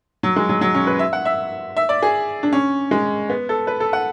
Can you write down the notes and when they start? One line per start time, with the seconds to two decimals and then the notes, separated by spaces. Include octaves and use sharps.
0.23 F#3
0.36 G#3
0.49 F#3
0.61 F#3
0.74 C#4
0.87 B4
0.99 E5
1.13 F#5
1.25 E5
1.77 E5
1.89 D5
2.02 G#4
2.43 D4
2.53 C#4
2.91 G#3
3.29 B3
3.49 A4
3.67 B4
3.80 A4
3.93 F#5